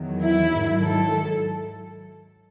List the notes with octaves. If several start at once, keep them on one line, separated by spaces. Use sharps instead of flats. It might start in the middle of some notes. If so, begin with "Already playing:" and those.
Already playing: E2 D#3 F#3
E4
G#2 D#3 F#3
A4